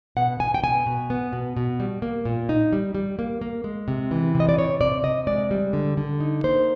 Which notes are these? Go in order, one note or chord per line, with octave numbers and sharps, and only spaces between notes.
B2 F#5
B2 G#5
G5
B2 G#5
B2
B3
B2
B2
G3
A#3
A#2
D#4
G3
G3
A#3
A#3
G#3
C3
E3
C3
D#5
D5
C3 C#5
C3 D5
C3 D#5
G#3 D5
G3
D3
D3
D#4
A#3 C5